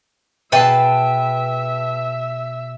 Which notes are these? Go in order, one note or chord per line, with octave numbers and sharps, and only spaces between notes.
B2 G#4 B4 E5 G5 A5 C7